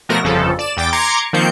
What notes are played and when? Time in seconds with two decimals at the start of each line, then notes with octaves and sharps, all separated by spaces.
0.09 B2 F3 A3 F#4 A#4 A#6
0.23 G1 F2 C#3 F3 A4
0.59 D5 E7
0.77 E2 G5 D6 A6
0.93 A#5 C6 D6 G#6 C#7
1.33 D#3 F3 A#3 C4 G6 C#7